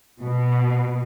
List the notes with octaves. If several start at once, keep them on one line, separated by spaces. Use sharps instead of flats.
B2